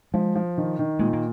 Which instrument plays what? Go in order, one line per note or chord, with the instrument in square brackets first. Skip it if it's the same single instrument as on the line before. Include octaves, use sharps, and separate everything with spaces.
[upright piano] F3 [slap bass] G#3
[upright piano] F3
D#3
D#3
[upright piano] A#2 [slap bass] G#3
[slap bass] A#3